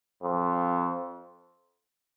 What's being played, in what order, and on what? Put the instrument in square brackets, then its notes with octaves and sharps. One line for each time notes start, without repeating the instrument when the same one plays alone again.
[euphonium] F2